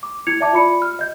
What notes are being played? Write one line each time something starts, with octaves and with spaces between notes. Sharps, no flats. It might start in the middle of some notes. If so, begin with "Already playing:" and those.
D6
E4 G#6 C#7 F7
D5 E5 A5 D6 G#6
F4 D5 B5 C#7
F6
D#5 G6